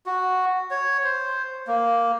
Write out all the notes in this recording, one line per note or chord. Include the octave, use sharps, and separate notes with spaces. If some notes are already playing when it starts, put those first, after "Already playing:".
F#4
C#5
C5
A#3